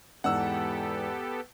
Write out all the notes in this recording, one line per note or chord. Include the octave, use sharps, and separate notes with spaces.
E2 G#2 E3 B3 G4 A4 F#5 E6